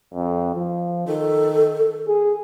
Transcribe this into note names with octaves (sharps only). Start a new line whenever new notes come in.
F2
F3
D#3 A4
G#4